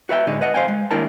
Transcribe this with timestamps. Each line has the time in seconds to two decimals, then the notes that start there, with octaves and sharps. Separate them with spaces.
0.09 F#4 B4 E5 G5
0.27 A2 D3 G#3 D4 D#4
0.41 B4 D#5 F#5
0.54 C5 D#5 F5 G5 G#5
0.68 G#3
0.91 D#2 D4 E4 A#4 G5 A5